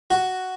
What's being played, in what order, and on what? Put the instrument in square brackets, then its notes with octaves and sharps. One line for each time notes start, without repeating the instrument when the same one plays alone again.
[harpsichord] F#4